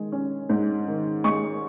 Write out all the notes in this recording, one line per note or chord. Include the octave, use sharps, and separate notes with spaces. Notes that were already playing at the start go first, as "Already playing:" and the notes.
Already playing: D#3 G#3
C#4
G#2
D#3
G#3 C#6